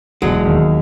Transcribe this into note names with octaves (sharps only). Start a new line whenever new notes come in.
E1 F#3 G#3
D#2